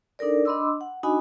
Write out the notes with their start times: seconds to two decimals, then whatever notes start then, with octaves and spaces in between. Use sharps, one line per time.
0.19 D4 D#4 A4 A#4 D5
0.45 D4 D#5 B5 C6 D6 E6
0.81 F#5
1.03 D4 D#4 F#4 D#5 G#5 B5